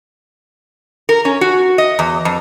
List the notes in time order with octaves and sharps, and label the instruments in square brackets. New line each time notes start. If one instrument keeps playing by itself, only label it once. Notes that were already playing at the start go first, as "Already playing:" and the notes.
[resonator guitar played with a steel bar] A#4
C#4
F#4
D#5
E2
F2